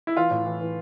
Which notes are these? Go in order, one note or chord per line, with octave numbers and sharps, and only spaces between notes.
E4
E3 F4
A2
E3
E3